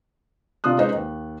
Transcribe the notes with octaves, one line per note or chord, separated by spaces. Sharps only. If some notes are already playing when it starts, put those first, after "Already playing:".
C3 D4 F4 D#6 F#6
G#3 C#4 D#4 B4 C5
D#2